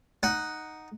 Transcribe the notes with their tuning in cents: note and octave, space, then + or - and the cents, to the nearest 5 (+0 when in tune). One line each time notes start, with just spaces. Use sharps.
D#4 +0 F#5 +0